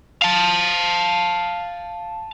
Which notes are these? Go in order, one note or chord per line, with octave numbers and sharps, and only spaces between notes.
F5 A5